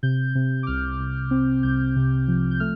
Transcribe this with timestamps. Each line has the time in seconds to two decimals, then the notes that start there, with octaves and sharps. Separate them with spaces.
0.03 C3 G6
0.35 C3
0.63 D6
0.67 C2 F6
1.00 C2
1.31 C4
1.63 C2 G6
1.96 C3
2.28 F3
2.51 G6
2.60 A3 F6